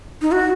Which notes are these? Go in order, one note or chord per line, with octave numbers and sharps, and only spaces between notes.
D#4
F#4